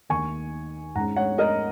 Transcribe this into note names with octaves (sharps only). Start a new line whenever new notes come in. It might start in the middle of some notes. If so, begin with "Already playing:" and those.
D#2 D#3 A#3 G#5 C#6
G#2 G#3 C#4 F#5 A#5
C#5 F#5
A#4 D#5